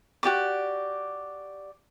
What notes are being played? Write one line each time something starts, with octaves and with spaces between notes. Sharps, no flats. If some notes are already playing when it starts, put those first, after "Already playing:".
F#4 G4 D5 D6